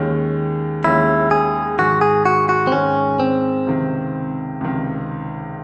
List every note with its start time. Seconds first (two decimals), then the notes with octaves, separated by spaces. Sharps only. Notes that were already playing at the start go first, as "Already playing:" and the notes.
Already playing: D#2 D#3 G#3 C#4
0.84 D#2 D#3 G#3 C#4 E4
1.31 G#4
1.78 G#2 D#3 G#3 F#4
2.01 G#4
2.25 F#4
2.49 F#4
2.67 C4
2.72 G#2 D#3 G#3 C#4
3.20 C4
3.67 C#2 C3 D#3
4.61 C#2 C3 D#3